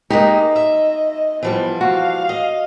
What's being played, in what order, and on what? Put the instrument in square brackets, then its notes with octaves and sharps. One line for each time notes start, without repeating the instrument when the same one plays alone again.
[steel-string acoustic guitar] G#3 A#3 G4 [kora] D#4 [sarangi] D#5
[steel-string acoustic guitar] E5
[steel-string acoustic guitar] E3 F3 G3 [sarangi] B3
[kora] F#4 [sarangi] F5
[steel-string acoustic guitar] D#5